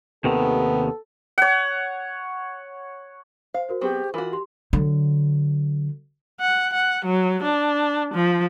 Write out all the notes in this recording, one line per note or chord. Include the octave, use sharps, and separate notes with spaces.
D#2 C3 D#3 B3 A4
C#5 F#5
C5 F5
F#4 A#4 C5
F#3 B3 C4 G4 G#4 C5 C#6
E3 F4 F#4 A#4 B5 D6
G4 C6
D3 F#3
F#5
F#5
F#3
D4
F3